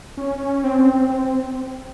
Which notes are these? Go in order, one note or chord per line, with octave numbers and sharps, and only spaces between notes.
C#4
C4
C4
C4
C4